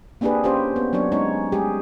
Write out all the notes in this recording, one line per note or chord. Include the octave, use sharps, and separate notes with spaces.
A#3 C4 D4 G4 G#4 B4
C#4 F4 G4 C5
B3
F#3 B3 D4 C#5
G#3 C#4 D#4 C#5
G3 G#3 G4 G#4